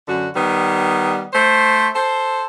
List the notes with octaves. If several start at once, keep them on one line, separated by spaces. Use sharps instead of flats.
F#2 D3 F#4
D#3 G3 B3
A3 C5
A4 C5